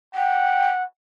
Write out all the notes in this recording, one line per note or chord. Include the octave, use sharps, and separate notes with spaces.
F#5 G5